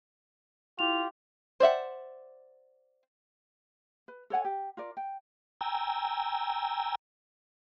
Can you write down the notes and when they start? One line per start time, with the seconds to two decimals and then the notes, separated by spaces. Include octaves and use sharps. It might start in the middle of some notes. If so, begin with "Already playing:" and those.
0.79 E4 F4 G4 F7
1.60 C5 D5 E5 F#5
4.08 B4
4.30 A4 C#5 F#5 G#5
4.45 G4
4.77 F4 A#4 D5
4.97 G5
5.61 G5 G#5 A#5 E6